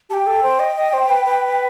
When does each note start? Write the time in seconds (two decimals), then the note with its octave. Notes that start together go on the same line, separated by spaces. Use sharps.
0.10 G4 A5
0.14 G5
0.27 A4
0.43 C5
0.60 D#5
0.77 D#5
0.93 C5
1.09 B4
1.25 B4